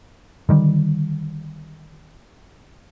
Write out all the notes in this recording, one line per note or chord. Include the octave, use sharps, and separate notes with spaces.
D3 D#3 G3